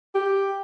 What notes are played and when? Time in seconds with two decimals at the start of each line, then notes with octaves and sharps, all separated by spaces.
0.15 G4